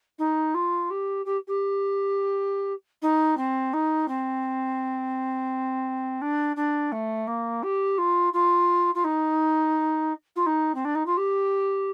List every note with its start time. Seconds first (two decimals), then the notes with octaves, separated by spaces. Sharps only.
0.18 D#4
0.54 F4
0.90 G4
1.25 G4
1.47 G4
3.02 D#4
3.37 C4
3.73 D#4
4.08 C4
6.21 D4
6.56 D4
6.92 A3
7.27 A#3
7.63 G4
7.98 F4
8.33 F4
8.94 F4
9.04 D#4
10.36 F4
10.46 D#4
10.74 C4
10.84 D4
10.95 D#4
11.06 F4
11.17 G4